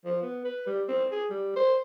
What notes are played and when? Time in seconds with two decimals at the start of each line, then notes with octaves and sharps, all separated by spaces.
0.05 F3
0.22 B3
0.45 B4
0.66 G3
0.89 C4
1.12 G#4
1.30 G3
1.56 C5